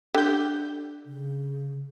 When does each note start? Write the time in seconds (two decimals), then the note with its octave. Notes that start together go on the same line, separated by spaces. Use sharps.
0.14 D3 G4 G6
1.06 C#3